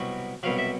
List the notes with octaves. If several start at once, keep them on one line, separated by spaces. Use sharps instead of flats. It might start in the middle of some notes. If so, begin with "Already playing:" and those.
Already playing: C2 B2 F#3
C2 B2 F#3 F5
E5